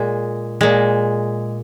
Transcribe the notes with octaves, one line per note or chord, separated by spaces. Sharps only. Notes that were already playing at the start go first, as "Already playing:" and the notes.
Already playing: A#2 G#3
A#2 G#3